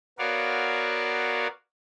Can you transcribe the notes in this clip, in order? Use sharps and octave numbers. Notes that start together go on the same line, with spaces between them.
B3 F#4 A#4 C#5 D5 F5